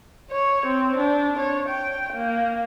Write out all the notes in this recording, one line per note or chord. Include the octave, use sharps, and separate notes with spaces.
C#5
C4
D4
C#5
G5
A#3